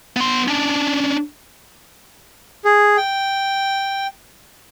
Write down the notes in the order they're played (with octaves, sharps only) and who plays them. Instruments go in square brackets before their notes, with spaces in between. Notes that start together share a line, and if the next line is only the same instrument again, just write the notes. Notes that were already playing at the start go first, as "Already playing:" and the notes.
[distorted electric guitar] B3 C6
C#4 D4
[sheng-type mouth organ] G#4
G5